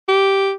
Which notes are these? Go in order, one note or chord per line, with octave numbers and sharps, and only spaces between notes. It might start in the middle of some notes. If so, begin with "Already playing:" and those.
G4